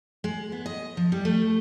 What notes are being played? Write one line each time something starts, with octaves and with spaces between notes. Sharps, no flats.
G#3
B3
D#5
F3
G3
A3